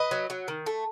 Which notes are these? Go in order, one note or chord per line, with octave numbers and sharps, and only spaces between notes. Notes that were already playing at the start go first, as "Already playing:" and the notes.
Already playing: B4 D#5
F#3
F#3
D#3
A3